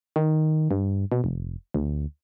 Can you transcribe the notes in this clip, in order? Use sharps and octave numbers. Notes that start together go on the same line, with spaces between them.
D#3
G2
B2
F1
D2